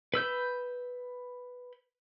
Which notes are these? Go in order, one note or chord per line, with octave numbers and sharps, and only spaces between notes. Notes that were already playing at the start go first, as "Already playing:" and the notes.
B4 E6 G6